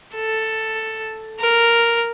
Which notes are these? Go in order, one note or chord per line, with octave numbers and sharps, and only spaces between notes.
A4
A#4